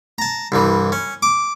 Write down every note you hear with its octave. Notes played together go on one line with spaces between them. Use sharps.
A5 A#5
C2 G2 E3
C#4
D6